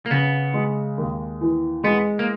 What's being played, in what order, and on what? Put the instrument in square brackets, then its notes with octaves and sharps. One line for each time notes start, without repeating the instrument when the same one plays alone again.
[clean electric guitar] A#3
[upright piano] C#3 [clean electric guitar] B3
[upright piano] G#3
D#2
E3
[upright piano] G#3 [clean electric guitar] B3
[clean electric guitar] A#3